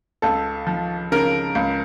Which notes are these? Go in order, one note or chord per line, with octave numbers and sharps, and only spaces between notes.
C#2 A4
F3
C#3 A#4
C#2